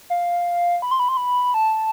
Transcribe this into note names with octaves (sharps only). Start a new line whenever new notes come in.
F5
B5
C6
B5
C6
B5
A5